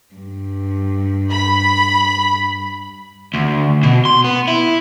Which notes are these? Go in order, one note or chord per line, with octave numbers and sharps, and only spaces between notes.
G2
B5
D2
B2
C6
B3
E4